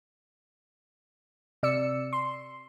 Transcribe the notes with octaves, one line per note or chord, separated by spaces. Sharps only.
C3 D5 E6 C#7
C6